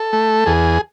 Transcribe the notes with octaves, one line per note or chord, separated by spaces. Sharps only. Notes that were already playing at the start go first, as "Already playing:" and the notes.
Already playing: A4
A3
E2 G#4